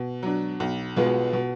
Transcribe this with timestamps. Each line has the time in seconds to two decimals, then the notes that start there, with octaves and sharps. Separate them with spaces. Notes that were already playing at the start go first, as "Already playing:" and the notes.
Already playing: B2
0.23 F#3 D4
0.60 B1
0.96 B2 G#3 B3 F4
1.33 B2